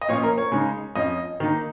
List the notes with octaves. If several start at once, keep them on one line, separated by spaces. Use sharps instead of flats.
D#5
A#2 F3 C#4 C#5
A#4
C#5
C#3 G#3 D#4
F2 F3 C#4 D#5
D#3 A#3 D#4